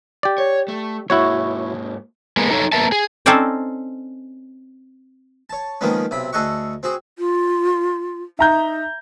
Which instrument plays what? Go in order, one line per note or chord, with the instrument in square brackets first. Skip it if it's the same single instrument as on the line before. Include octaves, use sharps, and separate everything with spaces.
[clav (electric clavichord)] G4 D5
[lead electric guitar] C#5
A3
[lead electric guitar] G#2 A#3 [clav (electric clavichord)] E4 F#4 C#5
[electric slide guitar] G#3 A#3 B3
D#4 A4 C5 C#5
A#3 B3 A#4 E5 A5
G#4
[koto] C4 C#4 D#4 A4 C5 D5
[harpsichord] C#5 A5
D#3 F3 G#3 A#3 B3 C#4
B1 C3 B5
D2 G#4 A4 D#5 F#5 C#6
C4 F#4 G#4
[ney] F4
[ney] D#4 [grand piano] E5 A#5 G6